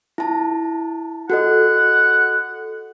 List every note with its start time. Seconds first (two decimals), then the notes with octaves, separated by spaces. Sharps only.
0.18 E4 A5
1.30 F#4 A4 D#5 F#5